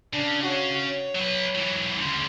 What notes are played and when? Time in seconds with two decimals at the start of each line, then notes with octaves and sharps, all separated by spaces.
0.13 C#3 D4
0.43 F#4 C#5
0.86 C#5
1.15 F#3 B4
1.55 E3 F#3
1.97 D2 C#3 C6